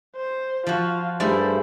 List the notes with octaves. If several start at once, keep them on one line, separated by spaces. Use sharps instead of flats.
C5
F3 F4 F#4
G2 G3 A3 E4 G#4 C5